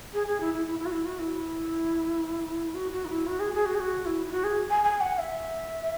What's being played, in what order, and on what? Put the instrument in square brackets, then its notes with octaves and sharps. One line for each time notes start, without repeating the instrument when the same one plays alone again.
[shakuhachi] G#4
G#4
E4
E4
E4
E4
F#4
E4
F#4
E4
F#4
F#4
D#4
E4
F#4
G#4
G#4
F#4
G#4
F#4
E4
E4
F#4
G#4
G#5
G#5
F#5
E5